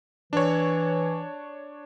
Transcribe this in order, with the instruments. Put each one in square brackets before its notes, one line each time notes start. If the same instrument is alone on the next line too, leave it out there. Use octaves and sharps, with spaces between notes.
[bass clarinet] E3 [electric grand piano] D4 C#5